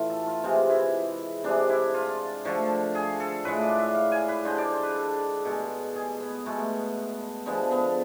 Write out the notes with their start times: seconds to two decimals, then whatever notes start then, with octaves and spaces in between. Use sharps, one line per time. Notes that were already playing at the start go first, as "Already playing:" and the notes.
Already playing: A2 E3 A3 F4
0.10 A4
0.27 F4
0.43 C3 E3 G#3 F4
0.69 E4
1.44 C3 G#3 D4
1.69 E4
1.94 F4
2.45 D3 F3 A3
2.95 G#4
3.20 A4
3.45 A2 G#3 B4
3.62 D5
3.79 E5
3.95 F5
4.12 G#5
4.28 B4
4.45 D3 G#3 C5
4.58 D5
4.70 C5
4.83 B4
4.96 A4
5.45 B2 G#3
5.96 G#4
6.20 B3
6.46 B2 G#3 A3
7.46 D3 F3 G#3 B3
7.71 B3